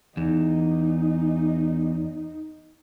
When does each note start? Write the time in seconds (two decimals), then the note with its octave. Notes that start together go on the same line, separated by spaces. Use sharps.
0.17 E2 D#4